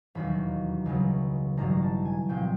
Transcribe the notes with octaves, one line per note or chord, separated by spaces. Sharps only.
E1 D#2 D#3 F#3 B5
C#2 C#3 F#3
A1 G2 D#3 F#3 A#5
A5
G#5
C2 A#2 F3 G5